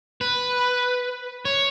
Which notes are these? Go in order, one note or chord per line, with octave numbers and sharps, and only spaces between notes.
B4
C#5